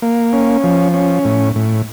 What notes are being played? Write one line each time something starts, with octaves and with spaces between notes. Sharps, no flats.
A#3
C#4
F3
C#4
A2
A2